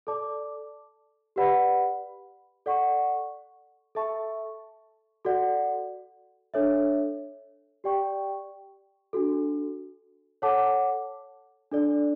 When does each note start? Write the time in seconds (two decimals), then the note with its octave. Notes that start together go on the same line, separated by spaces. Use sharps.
0.07 A4 D5 A5 D6
1.36 G4 B4 D5 F#5 B5
2.66 A4 D5 F#5 C#6
3.95 A4 E5 A5 C#6
5.25 F#4 A4 D5 F#5
6.54 D4 A4 C#5 E5
7.84 G4 D5 G5 C#6
9.13 D4 F#4 A4
10.42 A4 C#5 F#5 A5 D6
11.72 D4 A4 D5